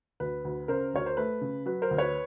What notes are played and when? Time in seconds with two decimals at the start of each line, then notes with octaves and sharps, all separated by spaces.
0.20 D2 B4
0.45 D2
0.68 C#3 A#4 C5
0.94 D2 C#5
1.06 C5
1.17 A3 B4
1.41 C#3
1.66 F#3 B4
1.82 A#4 C5
1.91 D2
1.98 B4 C#5